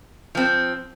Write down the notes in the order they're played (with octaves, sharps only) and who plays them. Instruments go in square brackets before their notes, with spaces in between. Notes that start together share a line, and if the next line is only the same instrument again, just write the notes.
[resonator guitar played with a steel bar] F3 C4